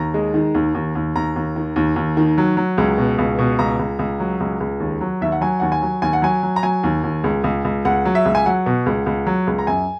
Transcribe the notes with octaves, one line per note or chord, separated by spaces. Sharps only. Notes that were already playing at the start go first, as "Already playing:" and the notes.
Already playing: D#2 A#5
G#3
D#3
D#2
D#2
D#2
D#2 A#5
D#2
D#3
D#2
D#2
D#3
F#3
F#3
C#2
B2
C#2
B2
C#2 A#5
C#2
C#2
F#3
C#2
C#2
D#2
F#3
D#2 E5
F#5
F#3 G#5
D#2 F#5
G#5
F#3
D#2 G#5
F#5
F#3 G#5
F#3
A#5
F#3 G#5
D#2
D#2
C#2
C#2
C#2
C#2 F#5
F#3
E5
C#2
G#5
F#3 F#5
B2
C#2
C#2
F#3
C#2
A#5
F#2 G#5